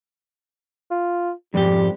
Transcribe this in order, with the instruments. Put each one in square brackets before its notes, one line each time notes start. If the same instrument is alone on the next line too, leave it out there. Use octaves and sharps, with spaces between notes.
[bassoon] F4
[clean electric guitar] F2 G#2 G4 [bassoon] G3